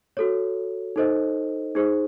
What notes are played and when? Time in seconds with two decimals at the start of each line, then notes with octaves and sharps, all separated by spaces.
0.17 F#4 A4 C#5
0.96 D#4 A4 C5 D#5
1.75 D#4 G#4 C5